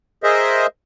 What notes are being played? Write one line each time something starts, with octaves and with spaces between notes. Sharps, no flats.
G#4 A#4 C5 D#5 E5